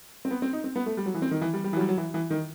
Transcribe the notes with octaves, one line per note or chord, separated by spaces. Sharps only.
C4
B3
C4
D#4
C4
B3
A3
G3
F#3
E3
C4
D#3
E3
G3
G3
E3
F#3
G3
F#3
E3
E3
D#3